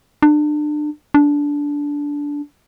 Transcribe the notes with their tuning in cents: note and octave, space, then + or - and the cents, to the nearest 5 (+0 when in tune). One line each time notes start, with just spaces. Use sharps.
D4 +30
D4 -15